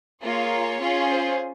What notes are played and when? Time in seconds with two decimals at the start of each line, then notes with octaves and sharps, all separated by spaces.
0.23 A#3 F4 G#4 C#5
0.80 C#4 F4 G#4
1.07 C5